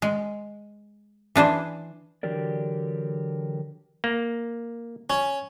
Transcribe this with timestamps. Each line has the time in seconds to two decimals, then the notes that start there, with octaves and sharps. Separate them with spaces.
0.02 G#3
1.36 E3 D4 G#4 C5
2.23 D3 E3 F#3 G4 A#4 D5
4.04 A#3
5.10 C#4